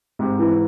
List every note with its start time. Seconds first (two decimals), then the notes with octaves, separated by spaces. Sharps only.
0.19 G#2 C3
0.39 E3